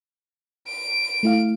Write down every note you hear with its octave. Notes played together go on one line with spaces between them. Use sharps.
D7
A3 E4 F5